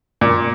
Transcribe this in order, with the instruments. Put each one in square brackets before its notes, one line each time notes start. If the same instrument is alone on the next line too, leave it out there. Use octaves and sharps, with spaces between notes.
[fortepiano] A#2